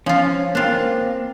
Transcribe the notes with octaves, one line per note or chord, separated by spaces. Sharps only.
F3 C#4 F4
A#3 C4 D4 F4